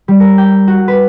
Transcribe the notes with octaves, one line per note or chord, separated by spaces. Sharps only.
G3
A#4
G5
F#4
B4